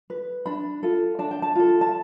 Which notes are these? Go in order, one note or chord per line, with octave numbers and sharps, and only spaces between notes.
B4
D4 B5
F4 A4
D4 A5
G5
A5
F4 A4
A5